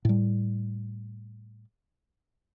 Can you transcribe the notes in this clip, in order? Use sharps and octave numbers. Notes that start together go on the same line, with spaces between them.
A2 G3